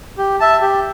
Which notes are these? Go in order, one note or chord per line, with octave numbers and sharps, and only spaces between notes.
G4
E5 A5
G4